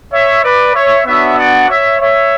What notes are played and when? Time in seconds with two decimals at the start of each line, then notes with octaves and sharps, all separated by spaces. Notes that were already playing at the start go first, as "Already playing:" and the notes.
0.13 C#5 E5
0.44 B4 D5
0.75 C#5 E5
1.06 B3 D4 F#4 C#5 E5
1.37 D5 F#5
1.69 C#5 E5
2.00 C#5 E5